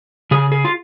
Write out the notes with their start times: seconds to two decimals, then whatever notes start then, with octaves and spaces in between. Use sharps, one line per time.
0.31 C#3 G#4
0.52 G#4
0.65 F4